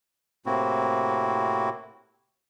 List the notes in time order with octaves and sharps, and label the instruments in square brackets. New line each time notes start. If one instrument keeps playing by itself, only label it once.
[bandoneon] A2 C3 A#3 C4 E4 F#4